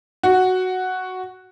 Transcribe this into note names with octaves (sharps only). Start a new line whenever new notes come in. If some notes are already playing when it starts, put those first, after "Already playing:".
F#4